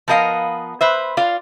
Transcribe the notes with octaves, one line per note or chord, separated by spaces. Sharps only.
F3 B3 A#4 D#5 F5
B4 C5 E5
F4 D5 F5